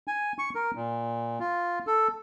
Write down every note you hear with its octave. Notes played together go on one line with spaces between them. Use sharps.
G#5
C#6
A#4
A#2
F4
A4